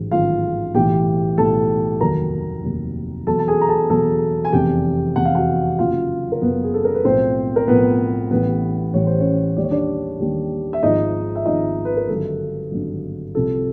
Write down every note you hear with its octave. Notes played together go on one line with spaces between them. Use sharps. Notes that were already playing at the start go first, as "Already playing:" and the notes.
Already playing: A1 G#2 D#3 F#3
A1 G#2 D#3 F#3 F4 F5
B1 A2 E3 G4 G5
B1 A2 E3 A4 A5
F1 D#2 D#3 F#3 A#4 A#5
F1 D#2 D#3 F#3
E2 B2 F#3 A4 A5
A5
G#4 G#5
A#5
A4 A5
E2 B2 F#3 A4 A5
G#5
F1 E2 C3 G4 G5
F1 E2 C3 F#5
F5
F#4 F#5
F#1 F#2 C#3 F4 F5
A#4
F#1 F#2 C#3 B3 B4
G#4
A4
A#4
B4
B1 A2 F3 C4 C5
A#4
B1 A2 F3 B3 B4
A1 A2 E3 G3 B3 B4
A1 A2 E3 G3 C#5
C5
C#4 C#5
D#2 D#3 G3 D5
C#5
D4 D5
D#2 D#3 G3
E5
G#1 G#2 F3 D#4 D#5
E5
G#1 G#2 F3 D#4 D#5
B4
A#4
G#1 G2 D3 F#3 A4
G#1 G2 D3 F#3
C2 C3 F3 A4